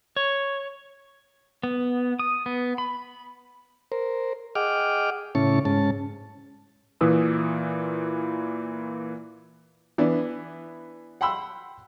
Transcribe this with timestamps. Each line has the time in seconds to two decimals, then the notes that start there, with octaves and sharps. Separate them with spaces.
0.17 C#5
1.63 B3
2.19 D#6
2.46 B3
2.78 B5
3.92 A#4 C5
4.55 G#4 D#5 F#5 G5 D6 F6
5.35 A2 C#3 C#4 E4 A5 C#6
5.65 G#2 C#4 A5
7.01 A#2 E3 E4 B4 D#6 E6
9.98 E3 B3 D4
11.21 F#5 G5 B5 C6 E6